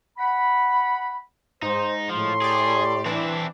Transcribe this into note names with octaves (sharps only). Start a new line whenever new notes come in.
F#5 B5
G#2 D#4 C5
A2 F3 C6
G4 G#4 D5
E3 C4 D4 E4